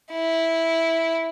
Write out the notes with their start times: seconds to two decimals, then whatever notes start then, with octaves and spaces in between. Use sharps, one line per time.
0.12 E4